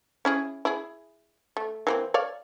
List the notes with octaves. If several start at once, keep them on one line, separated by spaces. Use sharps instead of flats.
C#4 E4 G#4
E4 G#4
A3
E3 A#3 C4
C#5 D5 F5